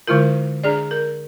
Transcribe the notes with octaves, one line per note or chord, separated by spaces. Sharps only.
D3 G#3 E4 F4 A#4
D4 G#4 D5
A#4